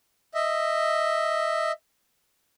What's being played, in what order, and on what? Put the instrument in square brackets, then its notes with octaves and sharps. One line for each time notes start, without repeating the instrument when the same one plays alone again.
[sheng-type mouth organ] D#5 E5